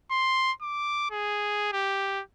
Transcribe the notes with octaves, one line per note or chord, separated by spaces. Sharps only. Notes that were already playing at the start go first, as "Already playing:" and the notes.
C6
D6
G#4
G4